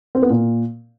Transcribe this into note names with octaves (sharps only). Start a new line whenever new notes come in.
C4
B3
A#2